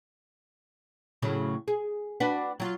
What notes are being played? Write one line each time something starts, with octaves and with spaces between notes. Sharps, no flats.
A2 C#3 F#3
G#4
D4 F#4 B4
F#3 F4